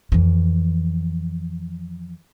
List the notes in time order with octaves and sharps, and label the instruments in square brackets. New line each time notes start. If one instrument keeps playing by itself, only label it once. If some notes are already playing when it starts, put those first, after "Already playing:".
[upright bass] F2 E3